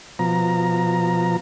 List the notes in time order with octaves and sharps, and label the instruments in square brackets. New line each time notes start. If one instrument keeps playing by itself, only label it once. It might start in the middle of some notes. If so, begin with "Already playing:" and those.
[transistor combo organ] B2 F3 A#5